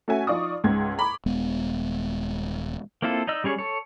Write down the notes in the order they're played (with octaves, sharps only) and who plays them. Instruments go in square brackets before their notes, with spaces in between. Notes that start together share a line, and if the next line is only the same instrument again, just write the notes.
[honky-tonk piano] A3 C#4 F#4 E5 G#5
F3 D#4 F4 D5 C#6 D#6
C#2 G#2 C#3 G#6
A#5 B5 C#6 D6
[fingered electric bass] D#1 G#3 B3
[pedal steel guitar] A#3 C4 E4 F4 A4
D#4 D5 D#5 E6
G3 C#4 G#4 C#5
A4 C#5